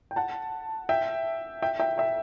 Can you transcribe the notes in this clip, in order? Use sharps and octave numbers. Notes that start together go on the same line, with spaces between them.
G5
F#5 A5
E5 G5
E5 G5
E5 G5
E5 G5